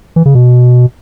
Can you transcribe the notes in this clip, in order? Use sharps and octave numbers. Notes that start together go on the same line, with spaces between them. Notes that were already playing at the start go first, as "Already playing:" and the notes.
E3
C#3
B2